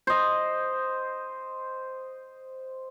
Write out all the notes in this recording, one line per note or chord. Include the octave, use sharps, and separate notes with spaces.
C5 D#5